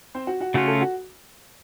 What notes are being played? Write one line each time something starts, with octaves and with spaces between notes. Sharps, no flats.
C4 C5
F#4 F#5
F#4 F#5
C#3 A3 C#4 F4 F#4 F#5
A4 A5
F#4 F#5